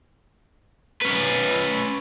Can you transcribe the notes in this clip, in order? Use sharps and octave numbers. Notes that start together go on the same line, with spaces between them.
C#4 B4